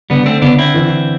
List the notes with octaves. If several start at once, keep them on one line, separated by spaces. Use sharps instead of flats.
D3 G3 B3
A3 C4
D3 B3 D4
C4 E4
E3